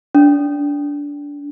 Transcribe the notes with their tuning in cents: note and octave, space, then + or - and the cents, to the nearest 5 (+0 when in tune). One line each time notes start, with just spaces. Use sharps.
D4 -20